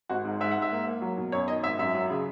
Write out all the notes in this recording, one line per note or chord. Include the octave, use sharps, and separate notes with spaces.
G#1 F#4
G#2
G#2 E5
F#5
G#2
E5
A#3
A#3
F#3
B2
F#2 C#5
D#3 D#5
G#1 E5
F#2 E5
F#3
C#3